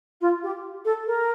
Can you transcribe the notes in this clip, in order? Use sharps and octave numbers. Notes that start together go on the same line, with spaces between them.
F4
G4
A4
A#4